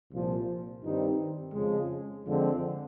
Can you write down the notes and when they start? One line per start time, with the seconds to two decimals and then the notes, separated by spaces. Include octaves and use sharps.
0.11 C2 A#2 F3
0.83 G2 D#3 G3 C4 D#4
1.54 F2 C#3 F3 G#3
2.26 F2 D3 F3 G#3 C4